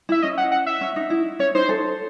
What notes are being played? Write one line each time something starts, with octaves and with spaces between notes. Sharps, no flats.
E4 E5
C#4 D#5
F#5
F#5
E5
C#4
D#4
E4
C#4 C#5
D#4 C5
A4